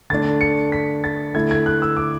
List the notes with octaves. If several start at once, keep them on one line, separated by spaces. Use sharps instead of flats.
D3 A3 D4 A6
C#7
B6
A6
D3 A3 E4 G#6
G#6
F#6
E6
D6